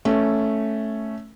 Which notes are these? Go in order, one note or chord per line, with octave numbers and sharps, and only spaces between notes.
A3 C#4